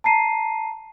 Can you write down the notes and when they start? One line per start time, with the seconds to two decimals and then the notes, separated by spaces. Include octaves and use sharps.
0.04 A5 A#5 C7 D#7